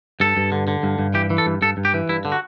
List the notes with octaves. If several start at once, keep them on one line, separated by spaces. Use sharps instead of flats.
G2 A4
G2
D3
D3
G2
G2
E3 G4
E3
A4
G2
G2 A4
G2
G4
E3
G2 E4
D3
F#4